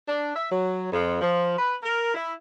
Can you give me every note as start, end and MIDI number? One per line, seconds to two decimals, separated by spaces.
0.09 0.33 62
0.36 0.50 76
0.52 0.87 54
0.92 1.19 41
1.22 1.57 53
1.59 1.76 71
1.83 2.12 70
2.15 2.32 64